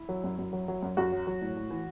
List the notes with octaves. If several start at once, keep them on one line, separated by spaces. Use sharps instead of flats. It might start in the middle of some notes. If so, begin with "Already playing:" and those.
Already playing: E4
F#3
F#2
F#2
F#3
F#3
F#2
F#2 F#4
F#3
F#3
A2
A2
E3